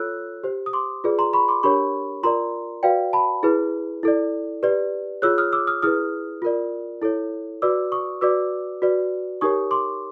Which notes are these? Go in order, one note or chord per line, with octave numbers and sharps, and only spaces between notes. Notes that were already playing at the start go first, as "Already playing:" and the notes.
Already playing: F4 A4 C#5 E6 F#6
G4 C5
D#6
C6 D6
F4 G#4 B4 D5
A#5 C6
B5 C#6
C6 D6
D4 G4 A#4 C#5 B5 C#6
F4 A#4 D5 A#5 C6
F#4 B4 D5 F5 G5
A5 B5
E4 G#4 B4
E4 A4 D5
G4 B4 D5
F4 G#4 C#5 E6 F#6
D#6 F6
D6 E6
D#6 F6
E4 G#4 B4 D#6 F6
F4 A#4 D5
E4 A4 C#5
F#4 B4 D5 D6 E6
C#6 D#6
F#4 B4 D5 D6 E6
F#4 B4 D5
D#4 G4 A#4 C#5 C#6 D#6
C6 D6